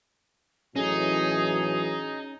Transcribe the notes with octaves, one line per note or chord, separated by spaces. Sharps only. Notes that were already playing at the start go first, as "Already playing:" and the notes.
A2 E3 F#3 C#4 D#4 G#4